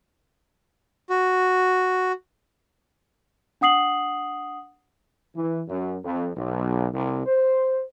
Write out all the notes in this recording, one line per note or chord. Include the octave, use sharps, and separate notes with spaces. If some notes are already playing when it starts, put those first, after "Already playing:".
F#4
D4 F#5 D#6 C7 F#7
E3
F#2
F2
B1
C2
C5